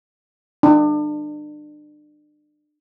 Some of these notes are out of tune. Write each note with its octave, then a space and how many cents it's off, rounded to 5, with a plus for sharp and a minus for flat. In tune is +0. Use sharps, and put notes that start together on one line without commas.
D4 +35